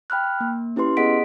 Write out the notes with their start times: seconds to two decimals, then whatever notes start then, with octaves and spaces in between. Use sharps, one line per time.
0.10 G5 B5 F6 F#6
0.40 A#3
0.76 C#4 E4 G4 B4 C6
0.97 B3 G#4 D#5 F#5 B6 D7